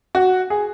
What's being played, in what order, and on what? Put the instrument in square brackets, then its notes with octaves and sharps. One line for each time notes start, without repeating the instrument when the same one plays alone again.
[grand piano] F#4
G#4